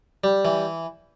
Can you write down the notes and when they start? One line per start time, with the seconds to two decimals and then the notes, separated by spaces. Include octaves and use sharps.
0.24 G3
0.45 E3